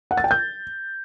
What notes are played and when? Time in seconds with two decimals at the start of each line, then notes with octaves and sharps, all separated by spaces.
0.11 F#5
0.17 A6
0.24 G5
0.31 G6